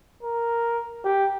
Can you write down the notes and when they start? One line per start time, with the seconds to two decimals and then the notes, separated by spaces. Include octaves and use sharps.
0.23 A#4
1.04 G4